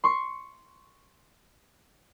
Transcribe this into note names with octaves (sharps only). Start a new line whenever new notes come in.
C6 C#6